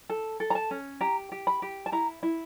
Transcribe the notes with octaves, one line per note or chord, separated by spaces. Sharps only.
A4
A4
A#5
A5
C#4
G4 A#5
G4
B5
G4
A5
E4 A#5
E4